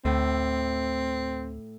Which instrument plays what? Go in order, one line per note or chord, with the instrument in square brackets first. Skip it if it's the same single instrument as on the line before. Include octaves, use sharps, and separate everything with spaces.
[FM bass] D2 [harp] A2 [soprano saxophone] C4